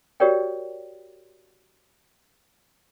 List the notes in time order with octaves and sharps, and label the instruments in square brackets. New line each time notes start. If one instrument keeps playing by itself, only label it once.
[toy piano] F#4 G4 A#4 C#5 D5 G5